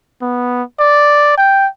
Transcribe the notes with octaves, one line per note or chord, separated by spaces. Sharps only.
B3
D5
G5